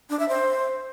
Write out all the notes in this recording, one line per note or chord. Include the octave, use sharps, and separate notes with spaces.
D4
E5
C5